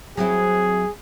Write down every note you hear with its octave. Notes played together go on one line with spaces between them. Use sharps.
F#3 C4 E4 G#4